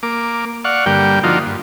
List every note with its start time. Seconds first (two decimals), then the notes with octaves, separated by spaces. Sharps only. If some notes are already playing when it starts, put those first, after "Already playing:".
0.03 A#3 D6
0.65 D5 F5 F#5 C#6
0.86 G2 D3 G3 A#3 G5
1.24 F3 A#3 D4 D#4 F4 F#4
1.46 G2